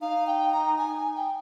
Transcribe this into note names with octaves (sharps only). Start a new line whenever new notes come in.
D#4 F5
G5
A#5
G#5
G#5
G5